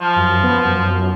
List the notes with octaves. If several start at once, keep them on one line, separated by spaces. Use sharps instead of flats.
F3
F#2
B3
F#2